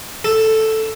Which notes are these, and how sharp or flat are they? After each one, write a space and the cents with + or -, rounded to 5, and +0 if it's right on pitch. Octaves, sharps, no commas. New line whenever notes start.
A4 +0